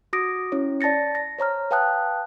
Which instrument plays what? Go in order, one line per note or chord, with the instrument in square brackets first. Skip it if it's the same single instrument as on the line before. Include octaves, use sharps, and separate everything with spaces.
[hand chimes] F#4 D6 D#6 A#6 D7
C#4 E4 C#5
D5 A5 A6 A#6 C#7
A#6
C5 C#5 A#5 F6
B4 F5 G5 A5 D#6 F#6